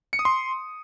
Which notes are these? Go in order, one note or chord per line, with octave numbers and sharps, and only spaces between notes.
C#7
D#6
C6